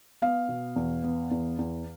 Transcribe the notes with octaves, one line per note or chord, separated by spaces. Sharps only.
B3 F5
B2
E2
B3
E2
E2